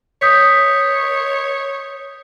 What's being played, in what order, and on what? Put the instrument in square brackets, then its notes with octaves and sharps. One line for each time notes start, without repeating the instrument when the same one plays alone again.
[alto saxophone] C#5 [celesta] D#6 G6 B6